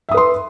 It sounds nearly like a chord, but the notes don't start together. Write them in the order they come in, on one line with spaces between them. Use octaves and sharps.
E5 D#6 B4 C6